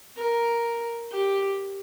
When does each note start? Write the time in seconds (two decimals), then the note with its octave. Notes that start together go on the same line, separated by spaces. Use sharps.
0.17 A#4
1.11 G4